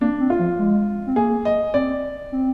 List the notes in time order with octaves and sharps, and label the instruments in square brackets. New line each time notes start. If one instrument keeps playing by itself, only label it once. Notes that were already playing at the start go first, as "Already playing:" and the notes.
[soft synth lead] A#3 [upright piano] D4
[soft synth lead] C4
[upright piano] F4
[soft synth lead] F3
G#3
C4
[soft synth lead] A#3 [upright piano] G#4
[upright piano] D#5
[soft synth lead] C4 [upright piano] D5
[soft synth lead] C4